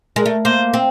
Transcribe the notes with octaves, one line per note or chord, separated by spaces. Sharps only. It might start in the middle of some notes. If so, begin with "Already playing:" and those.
G#3 A#4
A3
A#3 C5
C4